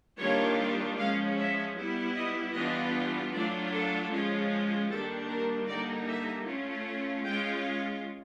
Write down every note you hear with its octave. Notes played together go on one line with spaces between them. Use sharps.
D#3 G3 A#3 D4 F4 C#5
F3 G#3 C#4 F5
E5
G3 B3 E4
D#5
E3 G3 B3 D4 F4 D#5
F#3 A3 D4 F4 D5
A4
F3 G#3 C#4 F4
D#3 G3 A#3 D4 A4
A#4
D3 G3 A#3 D#4 D5
E5
A3 C#4 F4
G#3 C#4 F4 G5